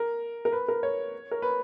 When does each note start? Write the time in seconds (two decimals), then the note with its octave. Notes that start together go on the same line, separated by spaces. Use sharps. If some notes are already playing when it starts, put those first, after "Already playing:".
Already playing: A#4
0.45 A#4
0.52 B4
0.68 A#4
0.83 C#5
1.31 A#4
1.42 B4